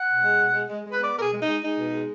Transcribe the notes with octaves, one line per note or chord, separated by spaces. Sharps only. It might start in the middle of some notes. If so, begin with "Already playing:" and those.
Already playing: F#5
B2
G#3
B2
G#3
G#3
G#3
B4
B3 D5
B2 G#4 A#4
G#3
D#4
G#3
G#3 D#4
B2
G#3